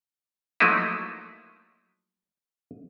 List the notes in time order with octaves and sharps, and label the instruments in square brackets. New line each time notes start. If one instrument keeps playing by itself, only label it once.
[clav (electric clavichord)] F3 F#3 A3 A#3 D#4 E4